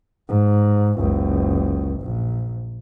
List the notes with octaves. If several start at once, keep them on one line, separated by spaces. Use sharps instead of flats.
G#2
F#1 C#2
A#1